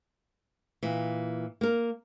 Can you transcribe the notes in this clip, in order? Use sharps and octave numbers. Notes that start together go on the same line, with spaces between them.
A#2 E3
A#3 A#4